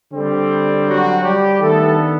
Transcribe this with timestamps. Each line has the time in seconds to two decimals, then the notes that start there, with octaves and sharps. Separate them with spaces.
0.13 D3 G3 C4
0.87 F#3 F#4
1.23 G3 G4
1.60 D#3 G3 A3 B3 D4 A4